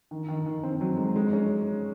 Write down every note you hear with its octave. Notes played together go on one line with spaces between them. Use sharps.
D#3
D#3
D#3
C4
F#3
G#2
G#3
C#4